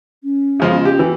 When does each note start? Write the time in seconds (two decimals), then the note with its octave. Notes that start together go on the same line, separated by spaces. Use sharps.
0.23 C#4
0.60 C#3 F3 G#3
0.85 G4
0.99 E3